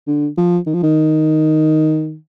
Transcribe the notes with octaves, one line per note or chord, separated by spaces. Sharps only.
D3
F3
D#3
F3
D#3